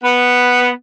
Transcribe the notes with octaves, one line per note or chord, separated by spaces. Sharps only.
B3